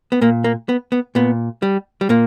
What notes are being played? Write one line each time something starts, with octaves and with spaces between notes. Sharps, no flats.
B3
A#2 A#3
A#3
B3
B3
A#2 B3
G3
G3
A#2 A#3